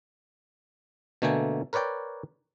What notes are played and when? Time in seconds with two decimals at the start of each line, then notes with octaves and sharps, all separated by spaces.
1.22 B2 D3 A3 A#3 G5 G#5
1.73 A#4 B4 C#5 D5 G5